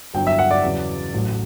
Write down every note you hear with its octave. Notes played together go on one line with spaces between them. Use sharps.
G1 G2 F#3 G5
E5
F#5
D5
E2 C#3 F#3
A1 A2 F#3